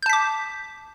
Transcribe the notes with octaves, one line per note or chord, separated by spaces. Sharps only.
A5 D6 G6 B6